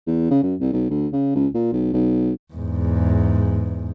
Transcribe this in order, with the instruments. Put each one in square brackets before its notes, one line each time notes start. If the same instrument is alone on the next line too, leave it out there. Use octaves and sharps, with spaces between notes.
[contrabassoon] E2
C#3
F#2
C2
B1
D2
C#3
C#2
A#2
B1
B1
[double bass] E2 G#2